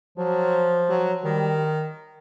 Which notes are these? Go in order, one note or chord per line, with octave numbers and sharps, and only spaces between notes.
F3 F#3
F#3
D#3 G3